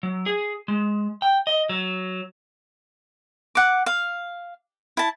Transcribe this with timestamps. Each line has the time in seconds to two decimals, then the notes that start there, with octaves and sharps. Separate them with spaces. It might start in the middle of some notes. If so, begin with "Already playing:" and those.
0.03 F#3
0.26 G#4
0.68 G#3
1.22 G5
1.47 D#5
1.69 F#3
3.55 F#5 D6
3.86 F5
4.97 E4 A5